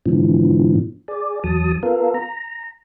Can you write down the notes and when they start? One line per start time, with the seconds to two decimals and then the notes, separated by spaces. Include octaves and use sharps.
0.06 G#2 B2 D3 E3 F3
1.08 G#4 D5
1.44 E2 F#3 A5 D#6
1.83 B3 F4 A4 A#4
2.15 A#5